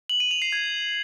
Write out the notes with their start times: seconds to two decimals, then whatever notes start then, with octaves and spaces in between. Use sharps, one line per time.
0.09 F#7
0.20 D#7
0.31 F7
0.42 C7
0.53 G#6